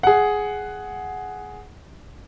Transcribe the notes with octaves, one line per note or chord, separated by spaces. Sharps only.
G#4 F#5